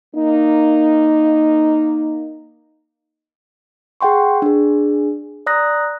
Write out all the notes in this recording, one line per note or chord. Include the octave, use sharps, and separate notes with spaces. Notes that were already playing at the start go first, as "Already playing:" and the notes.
A#3 D#4
G#4 F#5 G5 C6 C#6
D4 G#4
D5 A#5 D#6 F#6 A#6